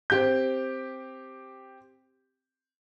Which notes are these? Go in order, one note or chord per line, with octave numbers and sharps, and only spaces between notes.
C4 G4 G6